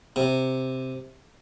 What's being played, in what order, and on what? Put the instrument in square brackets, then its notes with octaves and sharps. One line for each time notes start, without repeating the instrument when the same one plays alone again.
[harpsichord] C3